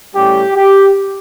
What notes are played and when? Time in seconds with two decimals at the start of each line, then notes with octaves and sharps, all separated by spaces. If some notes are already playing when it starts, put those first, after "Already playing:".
0.15 A2 G3 C#4 G4
0.55 G4